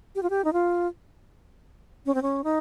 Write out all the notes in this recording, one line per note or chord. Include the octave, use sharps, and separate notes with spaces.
G4
F4
G4
D#4
F4
C#4
C4
C#4
D#4